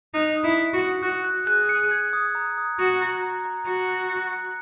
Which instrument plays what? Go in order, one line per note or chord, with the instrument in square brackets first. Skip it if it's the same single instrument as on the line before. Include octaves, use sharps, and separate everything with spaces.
[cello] D#4 [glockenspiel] F#6
[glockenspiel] D#6
[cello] E4
[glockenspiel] D#6
[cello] F#4
[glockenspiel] D#6
[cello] F#4 [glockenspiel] F#6
[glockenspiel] F#6
[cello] G#4 [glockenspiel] F#6
[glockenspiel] C#7
G#6
D#6
A#5
D#6
[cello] F#4 [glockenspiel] D#6
[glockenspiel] A#5
A#5
A#5
[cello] F#4 [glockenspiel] C#7
[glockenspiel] F#6
F#6
C#7